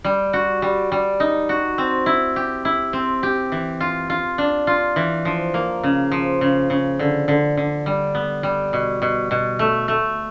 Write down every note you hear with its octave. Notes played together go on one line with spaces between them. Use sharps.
G3
F#4
G3
G3
D#4
F#4
C4
E4
G4
E4
C4
G4
E3
F4
F4
D4
F4
E3
F3
A#3
C#3
F3
C#3
C#3
D3
D3
D3
G3
B3
G3
B2
B2
B2
A3
A3